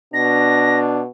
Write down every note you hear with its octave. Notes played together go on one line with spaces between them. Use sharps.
B2 D4 A#6